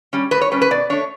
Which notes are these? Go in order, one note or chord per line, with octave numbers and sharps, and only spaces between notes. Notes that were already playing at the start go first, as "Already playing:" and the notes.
G3 C#4
A2 B4
C#5
G3 C#4 B4
B4
B2 D5
A3 D4 C#5